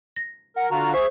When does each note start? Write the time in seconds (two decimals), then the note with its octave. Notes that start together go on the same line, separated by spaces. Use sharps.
0.16 A#6
0.56 A#4 F#5
0.71 D3 F4 F#4 A#5
0.94 G#4 C5 E5 C#6